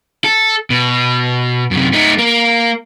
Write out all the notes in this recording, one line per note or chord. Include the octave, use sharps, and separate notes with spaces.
A4
B2
F#2 C3
A3 D#4
A#3